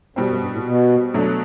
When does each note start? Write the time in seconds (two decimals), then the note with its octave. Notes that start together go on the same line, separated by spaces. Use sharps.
0.16 F#2 B2 G3 C4
0.29 F#2
0.41 G2
0.53 A2
0.66 B2
1.14 B2 F#3 A3 D4